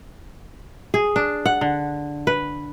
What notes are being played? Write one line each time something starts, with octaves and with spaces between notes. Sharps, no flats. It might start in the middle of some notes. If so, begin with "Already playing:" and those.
G#4
D4
F#5
D3
B4